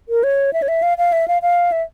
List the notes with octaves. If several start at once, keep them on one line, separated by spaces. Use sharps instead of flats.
A#4
C#5
E5
C#5
E5
F5
F5
E5
F5
F5
E5